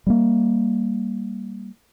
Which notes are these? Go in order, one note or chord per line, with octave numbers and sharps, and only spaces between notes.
G3 A3 A#3